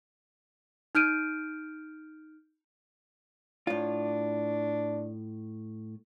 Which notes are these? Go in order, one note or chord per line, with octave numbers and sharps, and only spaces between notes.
D#4 F6 G6 D7 D#7
A2 D4 F4